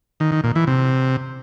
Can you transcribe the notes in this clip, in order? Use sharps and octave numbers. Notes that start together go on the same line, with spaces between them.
D#3
D#3
A#2
E3
C3